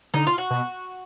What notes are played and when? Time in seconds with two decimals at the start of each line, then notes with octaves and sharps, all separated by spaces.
0.14 D3 D#4
0.27 F4
0.38 F#4
0.50 B2